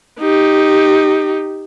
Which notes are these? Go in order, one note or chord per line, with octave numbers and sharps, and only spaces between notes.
D#4 G4